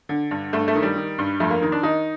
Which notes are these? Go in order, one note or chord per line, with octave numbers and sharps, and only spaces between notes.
D3
G2
G2 A3
A3
D#3
G3
D#3
G2
F2 A3
A#3
D#3
D4
D#3 D#4